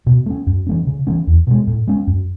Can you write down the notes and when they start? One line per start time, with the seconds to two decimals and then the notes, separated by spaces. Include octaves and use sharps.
0.06 B2
0.26 A3 C#4
0.47 F#2
0.67 E3 A3 C#4
0.87 C#3
1.07 E3 A3 C#4
1.27 E2
1.47 B2 G#3
1.67 A2
1.87 G#3 C#4
2.07 F#2